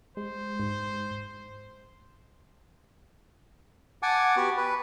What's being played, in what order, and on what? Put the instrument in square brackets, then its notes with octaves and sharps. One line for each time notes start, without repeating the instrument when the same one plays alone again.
[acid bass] G#3 [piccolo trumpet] C5
[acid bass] G#2
[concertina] F#5 G#5 A5 D6
B3 F#4 G4
B4